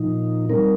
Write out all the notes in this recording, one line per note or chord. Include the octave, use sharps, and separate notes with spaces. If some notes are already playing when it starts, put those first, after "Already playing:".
Already playing: A#2 F3 D#4
G3 C4 D#4 A#4